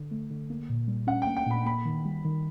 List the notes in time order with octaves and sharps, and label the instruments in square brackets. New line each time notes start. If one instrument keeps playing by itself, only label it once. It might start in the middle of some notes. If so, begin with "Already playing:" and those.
Already playing: [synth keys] D3
A3
D3
A#3
A#2
G3
[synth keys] C#4 [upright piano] F#5
[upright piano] G5
[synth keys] A#3
[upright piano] G5
[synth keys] A#2 [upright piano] B5
[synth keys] A#3 [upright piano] B5
[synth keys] D#3
G3
D#3